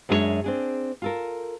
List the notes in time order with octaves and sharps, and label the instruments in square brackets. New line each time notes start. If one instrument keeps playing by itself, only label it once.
[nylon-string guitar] F#2 G#3 D4 D#4 C#5 E5
C4 D4 G#4
F4 A4 A#4